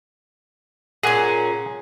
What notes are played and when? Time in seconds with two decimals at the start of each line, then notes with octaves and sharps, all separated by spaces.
1.03 A#2 C#4 G#4 F#5 G#5